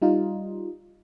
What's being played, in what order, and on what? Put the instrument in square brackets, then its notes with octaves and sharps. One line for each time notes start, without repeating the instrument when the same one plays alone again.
[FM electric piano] G3 D#4 F4